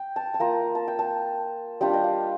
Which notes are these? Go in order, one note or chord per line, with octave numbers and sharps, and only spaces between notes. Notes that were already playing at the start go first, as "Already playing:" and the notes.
Already playing: G5
A5
A5
A#3 F4 A#5
A5
G5
A5
G3 D4 F4 G5
D#5
F5